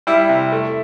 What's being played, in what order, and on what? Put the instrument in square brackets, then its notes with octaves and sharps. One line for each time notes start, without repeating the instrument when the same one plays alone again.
[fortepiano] G3 E4
C3
A3